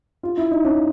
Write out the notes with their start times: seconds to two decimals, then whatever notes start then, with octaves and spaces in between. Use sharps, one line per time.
0.23 F4
0.37 E4
0.51 D#4
0.65 C#4